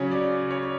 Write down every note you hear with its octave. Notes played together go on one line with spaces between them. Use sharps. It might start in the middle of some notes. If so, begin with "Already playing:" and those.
Already playing: C#3 F#3 C#4 C#5
D5
C#5